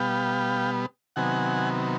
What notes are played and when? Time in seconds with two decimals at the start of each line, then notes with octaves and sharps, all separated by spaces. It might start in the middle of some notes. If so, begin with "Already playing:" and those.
Already playing: B2 G3 B3 F5 G5
1.16 C3 D#3 F#3 B3 F#5 G#5